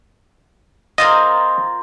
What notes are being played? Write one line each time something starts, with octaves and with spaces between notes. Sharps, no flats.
A#3 C4 F4 D#5